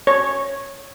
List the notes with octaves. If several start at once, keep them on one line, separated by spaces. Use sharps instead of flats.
C#5